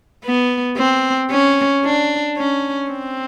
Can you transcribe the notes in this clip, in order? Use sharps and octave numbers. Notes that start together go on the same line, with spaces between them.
B3
C4
C#4
D4
C#4
C4